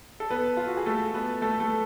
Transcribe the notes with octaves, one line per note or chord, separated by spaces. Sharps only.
A4
B3 B4
F4
F#4
G#4
A3 A4
B3 B4
A3 A4
A3 A4